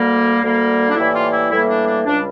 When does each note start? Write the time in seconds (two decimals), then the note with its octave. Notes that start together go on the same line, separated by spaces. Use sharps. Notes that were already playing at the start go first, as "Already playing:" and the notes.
Already playing: D2 D3 G3 A#3
0.41 D2 D3 G3 A#3
0.88 D4
0.95 A2 E3 G3 A#3 E4
1.14 F4
1.32 E4
1.50 A2 E3 G3 A#3 E4
1.68 D4
1.87 D4
2.05 C#2 C#3 G3 D4